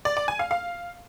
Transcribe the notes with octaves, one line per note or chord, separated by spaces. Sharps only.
D5
D5
G#5
F5
F5